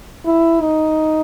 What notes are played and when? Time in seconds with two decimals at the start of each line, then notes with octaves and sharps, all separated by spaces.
0.26 E4
0.61 D#4